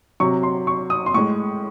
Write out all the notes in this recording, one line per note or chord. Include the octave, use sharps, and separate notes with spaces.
C3 F#3 C#6
C6
C#6
D#6
C6
A2 G#3 C#6